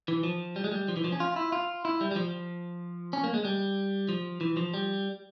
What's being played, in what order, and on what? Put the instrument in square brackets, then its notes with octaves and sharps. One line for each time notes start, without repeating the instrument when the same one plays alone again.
[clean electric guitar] E3
F3
G3
G#3
G3
F3
E3
F3
C#4
F4
E4
F4
E4
G3
G3
F3
C#4
A#3
G#3
G3
F3
E3
F3
G3